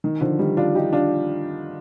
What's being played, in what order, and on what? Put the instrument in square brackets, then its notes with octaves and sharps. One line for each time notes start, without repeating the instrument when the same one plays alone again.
[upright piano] D#3
D3 F3
D#3 G3
D4 F4
D#4 G4
D4 F4